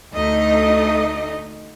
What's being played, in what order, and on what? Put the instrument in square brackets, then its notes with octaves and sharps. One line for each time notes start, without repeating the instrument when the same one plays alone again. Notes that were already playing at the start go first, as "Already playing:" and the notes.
[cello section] D2 A3 D#4 D#5